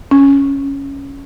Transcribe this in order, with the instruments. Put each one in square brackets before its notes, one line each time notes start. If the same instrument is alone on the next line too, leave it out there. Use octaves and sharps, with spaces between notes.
[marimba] C#4